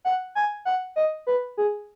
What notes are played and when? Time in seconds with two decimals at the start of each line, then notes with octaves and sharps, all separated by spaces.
0.05 F#5
0.35 G#5
0.65 F#5
0.96 D#5
1.27 B4
1.57 G#4